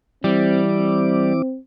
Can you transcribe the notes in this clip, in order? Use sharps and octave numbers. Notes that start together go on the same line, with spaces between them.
E3 G3 C4 E4 D6
C4